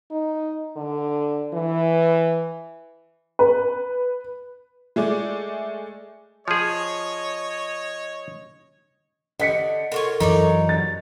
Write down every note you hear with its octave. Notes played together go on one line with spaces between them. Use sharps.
D#4
D3
E3
B4
G#3 A3 G#4 D5
F3 G#4 C#5 D#5
D3 D#5 B6 C#7
F4 F#4 A4 A#4 C#5
F#2 E3 D#4 C#5 D5
A6